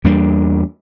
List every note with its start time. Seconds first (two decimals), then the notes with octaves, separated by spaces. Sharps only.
0.04 E2 G3 A#3 D4